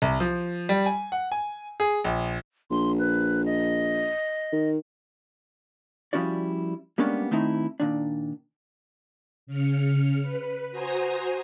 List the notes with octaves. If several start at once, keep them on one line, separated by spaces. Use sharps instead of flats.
C2
F3
G3
G#5
F#5
G#5
G#4
A#1
A#1 C6
B4
D#5
D#3
F3 G3 C#4 E4 F#4 D5
G3 G#3 A#3 B3 C#4 D4
D#3 A3 C4 D#4 E4
A#2 D#3 D4
C#3 F6 C#7
B4
F#4 C5 G#5 A#5 D#6